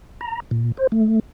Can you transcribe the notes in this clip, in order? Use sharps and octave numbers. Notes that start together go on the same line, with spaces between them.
A#5
A#2
C5
A3